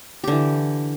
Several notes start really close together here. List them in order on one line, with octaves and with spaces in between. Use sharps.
G4 D3 E3